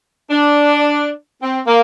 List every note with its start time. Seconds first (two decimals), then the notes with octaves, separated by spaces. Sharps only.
0.30 D4
1.42 C4
1.66 A#3